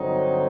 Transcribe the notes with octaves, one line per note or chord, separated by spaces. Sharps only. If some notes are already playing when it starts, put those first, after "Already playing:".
Already playing: G2 D3 F#3 C4 D#4